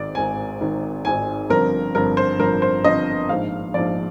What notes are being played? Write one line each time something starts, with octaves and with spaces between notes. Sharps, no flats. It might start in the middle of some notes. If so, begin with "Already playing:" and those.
Already playing: G#1 G#2 D#3 D5
G#1 G#2 D#3 G#5
G#1 G#2 D#3
G#1 G#2 D#3 G#5
G1 G2 F3 C4 A#4
G1 G2 F3 C4 A#4
C5
G1 G2 F3 C4 A#4
C5
G1 G2 F3 C4 D#5
A#1 G#2 F3 F5
A#1 G#2 F3 D5